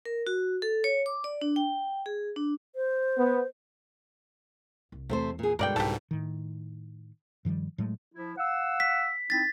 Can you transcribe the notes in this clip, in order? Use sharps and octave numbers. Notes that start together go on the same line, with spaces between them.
A#4
F#4
A4
C#5
D6
D5
D4
G5
G#4
D4
C5
B3
C2
E2 C3 A3 C5
A#2 G#4
G2 B2 D3 G#3 A#4 D5 G5
C2 G#2 C#3 A3 G4 A4
A2 D#3
G2 D#3 F3 G3
A2 F#3 G#3 A3
F3 E4
F5 F#5 E6
B6
C4 D#4 E4 A6 B6